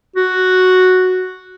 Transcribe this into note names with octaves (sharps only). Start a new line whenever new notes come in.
F#4